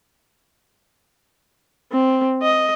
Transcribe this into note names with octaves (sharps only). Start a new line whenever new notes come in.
C4
D#5